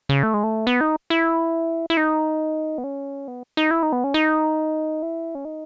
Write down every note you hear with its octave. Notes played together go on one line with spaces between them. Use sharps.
C#3
A3
G#3
A3
B3
D#4
E4
E4
D#4
B3
C#4
B3
D#4
E4
D#4
B3
C#4
D#4
E4
C#4
D#4